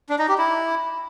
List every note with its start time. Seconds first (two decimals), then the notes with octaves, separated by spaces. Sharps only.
0.09 D4
0.19 D#4
0.28 G4
0.38 E4